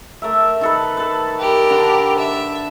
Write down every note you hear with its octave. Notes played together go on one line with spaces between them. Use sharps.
A3 A#4 E5
D#3 A4 B4
A4 B4
G4 A#4
D3 D4
E5